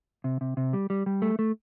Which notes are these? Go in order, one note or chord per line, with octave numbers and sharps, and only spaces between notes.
C3
C3
C3
G3
G3
G3
A3
A3